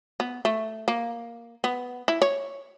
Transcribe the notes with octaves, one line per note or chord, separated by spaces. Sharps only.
B3
A3
A#3
B3
E4
C#5